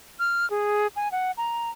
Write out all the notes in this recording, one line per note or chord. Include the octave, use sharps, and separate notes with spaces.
F6
G#4
G#5
F#5
A#5